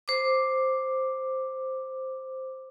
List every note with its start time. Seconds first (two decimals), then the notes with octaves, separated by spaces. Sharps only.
0.08 C5 D6